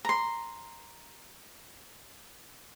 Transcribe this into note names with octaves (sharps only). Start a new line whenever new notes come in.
A#5 C6